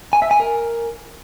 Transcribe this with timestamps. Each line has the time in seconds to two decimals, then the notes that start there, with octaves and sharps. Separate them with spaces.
0.13 G#5
0.22 E5
0.31 G#5
0.40 A#4